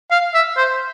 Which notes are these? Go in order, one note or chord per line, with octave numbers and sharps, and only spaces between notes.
F5
E5
C5